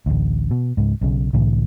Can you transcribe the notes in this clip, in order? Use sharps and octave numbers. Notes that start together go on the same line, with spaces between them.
A1 D2
B2
C#2 G#2
B1 C#3
C2 A2 D3 E3